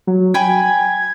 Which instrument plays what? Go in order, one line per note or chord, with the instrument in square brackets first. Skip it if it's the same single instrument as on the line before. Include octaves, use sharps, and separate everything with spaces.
[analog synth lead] F#3
[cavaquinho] G5 G#5 B5 [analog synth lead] G#6